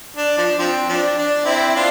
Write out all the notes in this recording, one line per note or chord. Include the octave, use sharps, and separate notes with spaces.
D4
F3 D4
F3 C4
F3 D4
D4
C4 E4
D4 F4